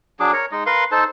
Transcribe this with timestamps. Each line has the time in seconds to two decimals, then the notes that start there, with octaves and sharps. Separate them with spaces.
0.20 F#3 D4 G#4 D6
0.33 A#4 C#5
0.52 G#3 D#4 D#5
0.66 A#4 B4 F5 C6
0.92 D#4 A4 C5 A5